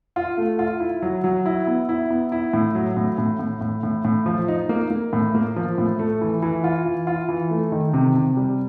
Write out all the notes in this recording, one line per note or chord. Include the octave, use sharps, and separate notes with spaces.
F4
A3
F4
E4
F#3
F#3
E4
B3
E4
B3
E4
A2
F#3
A2
A2
A2
A2
A2
A2
F3
D#4
A#3
A#3
A2
A#3
F3
A2
A3
E3
E3
F4
E3
F4
E3
A3
D#3
C3
C3
G3